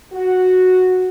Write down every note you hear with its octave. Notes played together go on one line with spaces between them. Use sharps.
F#4